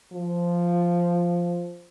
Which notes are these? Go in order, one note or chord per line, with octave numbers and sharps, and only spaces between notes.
F3